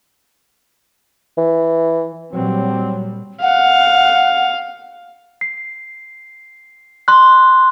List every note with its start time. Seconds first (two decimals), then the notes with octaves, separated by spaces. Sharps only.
1.38 E3
2.33 A#2 F#3 G3 C4
3.42 F5 F#5
5.41 C7
7.08 C6 F#6